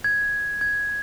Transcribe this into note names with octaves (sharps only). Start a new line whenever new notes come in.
G#6
G#6